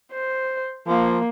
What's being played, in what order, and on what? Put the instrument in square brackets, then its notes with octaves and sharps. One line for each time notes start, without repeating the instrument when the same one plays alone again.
[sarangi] C5
[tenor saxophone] F3 [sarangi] A#3